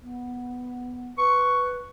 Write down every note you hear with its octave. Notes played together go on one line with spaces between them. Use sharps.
B3
B4 C#6